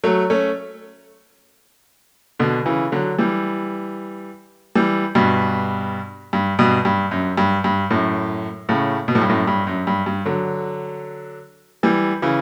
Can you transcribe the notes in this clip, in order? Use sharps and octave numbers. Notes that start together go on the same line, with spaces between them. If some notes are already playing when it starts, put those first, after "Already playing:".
F#3 A3
A3 C#4
B2 D3
C#3 E3
D3 F#3
E3 G3
E3 G3
G2 B2
G2
G2 B2
G2
F#2
G2
G2
F#2 A2
A2 C#3
B2
A2
G2
F#2 A2
G2
F#2
G2
G2
D3 F#3
E3 G3
C#3 E3